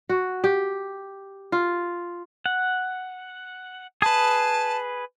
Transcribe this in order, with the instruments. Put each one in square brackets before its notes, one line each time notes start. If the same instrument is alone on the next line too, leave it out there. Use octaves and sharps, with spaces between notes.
[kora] F#4
G4
F4
[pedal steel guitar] F#5
[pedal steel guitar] G#4 B4 [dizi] A5